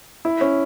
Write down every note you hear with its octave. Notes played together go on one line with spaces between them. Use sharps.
E4
C#4